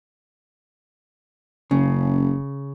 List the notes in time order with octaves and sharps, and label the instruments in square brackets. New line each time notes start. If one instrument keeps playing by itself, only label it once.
[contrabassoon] F#1 [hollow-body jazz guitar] C#3